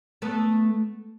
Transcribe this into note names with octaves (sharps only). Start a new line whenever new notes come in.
A3 B3